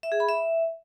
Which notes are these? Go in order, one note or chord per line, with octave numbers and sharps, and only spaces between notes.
E5
G#4
B5
E5